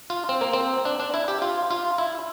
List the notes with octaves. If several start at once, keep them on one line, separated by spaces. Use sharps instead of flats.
F4
C4
A#3
C4
D4
D4
E4
G4
F4
F4
E4